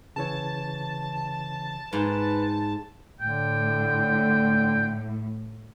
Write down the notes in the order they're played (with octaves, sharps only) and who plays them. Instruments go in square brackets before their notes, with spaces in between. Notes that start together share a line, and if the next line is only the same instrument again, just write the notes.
[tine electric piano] C#3 E3 C#5 [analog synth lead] A5
[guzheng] G#2 [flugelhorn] B4
[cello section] A2 [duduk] D3 [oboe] G5